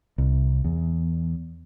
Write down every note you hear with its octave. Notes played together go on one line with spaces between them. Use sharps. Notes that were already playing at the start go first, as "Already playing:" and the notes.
C2
E2